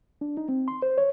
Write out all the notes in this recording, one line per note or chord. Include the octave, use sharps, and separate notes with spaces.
D4
D#4
C4
C6
C5
C#5